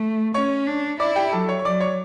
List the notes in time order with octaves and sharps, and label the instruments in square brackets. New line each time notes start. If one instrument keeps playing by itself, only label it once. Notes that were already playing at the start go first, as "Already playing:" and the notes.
Already playing: [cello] A3
[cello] C#4 [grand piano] C#5 C#6
[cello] D4
[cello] E4 [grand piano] D5 D6
[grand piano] G4 G5
[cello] F#3 [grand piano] A4 A5
[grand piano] C#5 C#6
C#6
[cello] F#3 [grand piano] D5 D6
[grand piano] C#5 C#6